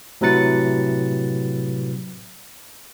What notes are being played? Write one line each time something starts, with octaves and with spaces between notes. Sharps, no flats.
A2 C3 F#3 B4 A6 C#7